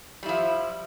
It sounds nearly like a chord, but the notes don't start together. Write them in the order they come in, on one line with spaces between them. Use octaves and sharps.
G3 E4 F3